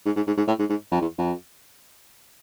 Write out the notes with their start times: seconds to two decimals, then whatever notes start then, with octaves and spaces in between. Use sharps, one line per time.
0.05 G#2
0.16 G#2
0.27 G#2
0.37 G#2
0.48 A2
0.59 G#2
0.69 G#2
0.91 F2
1.01 E2
1.18 F2